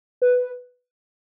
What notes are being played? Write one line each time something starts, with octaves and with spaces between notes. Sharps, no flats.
B4